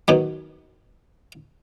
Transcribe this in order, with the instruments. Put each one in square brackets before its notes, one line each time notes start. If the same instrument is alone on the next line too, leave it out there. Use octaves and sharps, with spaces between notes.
[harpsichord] B2 D#3 F#3